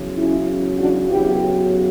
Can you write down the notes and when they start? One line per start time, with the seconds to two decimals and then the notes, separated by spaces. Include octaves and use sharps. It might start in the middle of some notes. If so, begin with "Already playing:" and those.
Already playing: E2 C#3 F#3
0.15 C#4 E4
0.78 D4 F#4
1.09 F#2 C#3 F#3 B3 E4 G4